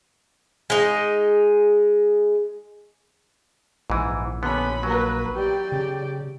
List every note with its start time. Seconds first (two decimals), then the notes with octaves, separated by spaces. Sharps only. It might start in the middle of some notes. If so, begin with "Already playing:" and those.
0.70 G#3 D#4
3.90 A#1 G#2 E3
4.43 D3 B3 C#4 B5
4.83 F#3 A#3 B4
5.35 G4 D5
5.72 C#3